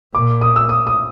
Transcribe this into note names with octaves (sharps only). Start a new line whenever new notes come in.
A#2 D6
D#6
E6
D#6
D#6